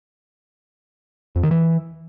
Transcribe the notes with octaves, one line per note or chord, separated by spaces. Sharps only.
F2
D#3
E3